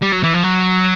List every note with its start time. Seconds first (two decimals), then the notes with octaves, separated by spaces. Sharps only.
0.02 G3
0.13 F#3
0.23 E3
0.34 F3
0.43 F#3